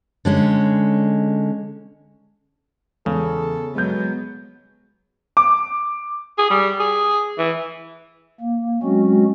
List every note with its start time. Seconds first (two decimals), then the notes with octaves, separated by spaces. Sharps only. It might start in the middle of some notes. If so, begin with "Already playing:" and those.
0.25 D3 G#3 C#4
3.06 E2 C#3 A4
3.75 F#3 G#3 B3 G6
5.37 D6
6.38 G#4
6.50 G3
6.80 G#4
7.38 E3
8.41 A#3
8.83 F#3 G#3 C4 C#4 F#4